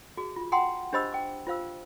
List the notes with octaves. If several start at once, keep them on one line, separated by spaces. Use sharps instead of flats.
F#4 G#4
F4
F#5 G5 A#5 C6 D#6
D4 G4 C5 D#5 B5 E6
G5 D6
F4 C5 F5 E6